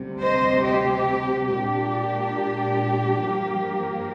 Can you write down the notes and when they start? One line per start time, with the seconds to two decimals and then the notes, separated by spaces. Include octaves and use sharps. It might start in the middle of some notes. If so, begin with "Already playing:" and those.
Already playing: D2 C3 G3
0.22 C5 D#5
0.65 G4
1.48 A#2 G#3 D4 G4
3.19 G2 F3 A#3